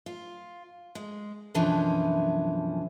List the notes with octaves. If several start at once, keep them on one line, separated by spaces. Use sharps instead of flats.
F4
G#3
F#2 B2 D3 E3 F3 C#4